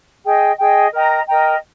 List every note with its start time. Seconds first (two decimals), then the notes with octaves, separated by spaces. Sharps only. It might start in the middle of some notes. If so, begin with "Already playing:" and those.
0.24 G#4 D#5 G5
0.58 G#4 D#5 G5
0.92 A#4 D#5 G5 A#5
1.27 A#4 D#5 G5 A#5